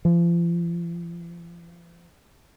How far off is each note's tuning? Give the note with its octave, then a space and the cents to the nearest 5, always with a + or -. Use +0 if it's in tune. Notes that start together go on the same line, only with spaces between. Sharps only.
F3 -40